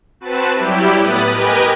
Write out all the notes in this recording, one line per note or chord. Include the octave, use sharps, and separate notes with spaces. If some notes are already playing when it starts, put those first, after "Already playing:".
C4 F#4 B4 A5
F#3 G3 E4 G4
A2 B3 B4 D#6 F#6 A6
G4 A#4 B4 D#5 G#5